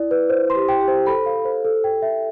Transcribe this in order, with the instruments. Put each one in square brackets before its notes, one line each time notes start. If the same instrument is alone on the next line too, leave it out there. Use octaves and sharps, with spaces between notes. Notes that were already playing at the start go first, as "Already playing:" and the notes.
Already playing: [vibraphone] E4 [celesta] D5
[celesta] B4
C5
C6
[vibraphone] G4
[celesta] G5
[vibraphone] G4
[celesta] C5
[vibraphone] A4 [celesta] B5
[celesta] F5
C5
A4
G5
E5